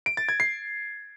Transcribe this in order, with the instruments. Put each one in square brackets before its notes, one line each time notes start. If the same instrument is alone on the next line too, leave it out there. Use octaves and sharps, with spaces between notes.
[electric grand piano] D7
A6
G#6
C7